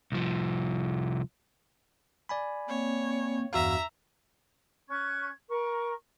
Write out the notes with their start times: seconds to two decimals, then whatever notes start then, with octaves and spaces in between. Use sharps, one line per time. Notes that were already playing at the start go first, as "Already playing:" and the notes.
0.12 C2 F3
2.29 D5 G#5 B5
2.69 A#3 C4 C#5
3.53 E2 G2 F#4 E5 F5 A#5
4.89 C#4 C#6 F#6 G#6
5.49 A#4 C#6